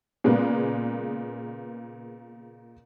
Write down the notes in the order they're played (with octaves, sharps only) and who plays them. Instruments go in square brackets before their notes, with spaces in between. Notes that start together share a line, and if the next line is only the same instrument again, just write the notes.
[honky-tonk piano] A#2 C#3 G#3 A#3 B3